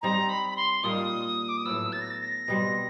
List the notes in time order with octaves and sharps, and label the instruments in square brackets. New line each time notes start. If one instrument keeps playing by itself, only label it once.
[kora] G3 C4 D#4 [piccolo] A#5
[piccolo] B5
B5
C6
[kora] A#2 G3 A#3 D#4 [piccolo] D#6
[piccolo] D6
D#6
[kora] A2 F#3 B3 [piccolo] E6
[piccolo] A6
A#6
A6
A#6
[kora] B2 G3 C4